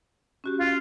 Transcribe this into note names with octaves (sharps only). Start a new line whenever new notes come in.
C#4 F#4 G4
F4